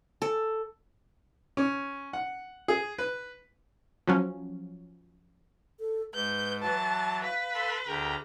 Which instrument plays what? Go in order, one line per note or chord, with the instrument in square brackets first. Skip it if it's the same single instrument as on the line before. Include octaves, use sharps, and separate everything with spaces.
[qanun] A4
[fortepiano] C#4
F#5
G#4
B4
[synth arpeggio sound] F3 F#3 C#4
[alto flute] A4
[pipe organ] G#2 [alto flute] B4 [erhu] G6
[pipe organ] E3 F#3 [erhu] A5
[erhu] B4 [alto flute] F5
[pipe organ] A4 B5 C6
[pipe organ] D2 G5 A#5 [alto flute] G#4